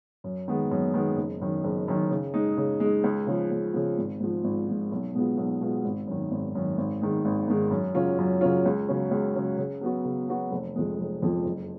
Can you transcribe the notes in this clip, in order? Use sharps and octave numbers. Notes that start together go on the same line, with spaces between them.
F#2
D#3 G#3 B3
F#2
D#3 G#3 B3
F#1
F#2 D#3
F#1
F#2 D#3
C#3
G#3 D#4
C#3
G#3 D#4
C#2
C#3 F3
C#2
C#3 F3
G#1
G#2 F3
G#1
G#2 F3
B1
B2 G#3 B3 F4
B1
B2 G#3 B3 F4
G#1
F#2 D#3
G#1
F#2 D#3
G#1
G#2 D#3 G#3
G#1
G#2 D#3 G#3
F#2
C#3 F#3 C#4 F4
F#2
C#3 F#3 C#4 F4
C#2
C#3 F#3 C#4
C#2
C#3 F#3 C#4
C#3
F#3 B3 F#4
C#3
F#3 B3 F#4
F1
F2 F3 G#3
F1
F2 F3 G#3
F#1